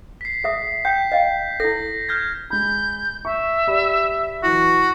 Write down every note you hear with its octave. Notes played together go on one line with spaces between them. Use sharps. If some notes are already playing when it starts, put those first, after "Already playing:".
B6 C7
G#4 E5 D#6
G5 G6 B6
D#5 F5 G5
E4 A4 A#6
F6 G6 G#6
G#3 B5 G6
E5 C#6
G4 D5 B5
E3 F#3 E4 F#4